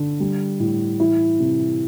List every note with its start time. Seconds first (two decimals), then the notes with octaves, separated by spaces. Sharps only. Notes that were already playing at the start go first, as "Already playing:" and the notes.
Already playing: D3
0.20 G3
0.60 A2
1.00 E3 E4
1.40 C3